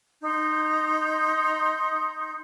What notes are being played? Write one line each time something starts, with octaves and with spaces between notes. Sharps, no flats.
D#4 C6 G6